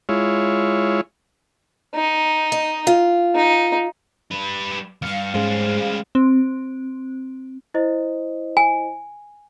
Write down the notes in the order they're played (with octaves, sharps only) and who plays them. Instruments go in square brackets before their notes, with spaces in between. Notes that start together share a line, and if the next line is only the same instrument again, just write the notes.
[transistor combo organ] G#3 E4 F4 C#5
[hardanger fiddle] D#4
[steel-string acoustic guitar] D#5
F4
[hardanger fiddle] D#4
[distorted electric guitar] G3 B4
[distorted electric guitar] E2 G2 [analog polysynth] F5 [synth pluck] C#7
[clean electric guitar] G#2 [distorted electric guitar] G3 G#3 [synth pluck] C#4 G#4 C5
[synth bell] C4
[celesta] E4 C5 D#5
[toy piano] G#5